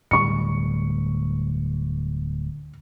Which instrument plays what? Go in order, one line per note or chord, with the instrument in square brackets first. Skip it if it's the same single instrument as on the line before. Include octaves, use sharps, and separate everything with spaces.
[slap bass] D1 G3 [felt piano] C#6 C#7